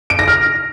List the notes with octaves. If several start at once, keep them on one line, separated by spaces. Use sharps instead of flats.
D7
A#6
F6